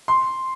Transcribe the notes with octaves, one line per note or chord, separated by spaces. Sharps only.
C6